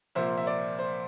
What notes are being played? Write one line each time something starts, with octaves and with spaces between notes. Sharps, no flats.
C2 A#2 F3 A#3 C5 E5
E5
D5
C5